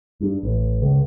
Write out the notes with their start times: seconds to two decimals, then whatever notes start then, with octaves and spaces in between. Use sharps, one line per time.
0.20 G2
0.43 A1
0.82 C#2